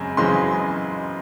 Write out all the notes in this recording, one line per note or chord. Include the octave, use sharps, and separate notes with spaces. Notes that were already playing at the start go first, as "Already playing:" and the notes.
Already playing: F#2 C#3 G#3 C4
F#2 C#3 E3 G#3 C4 C6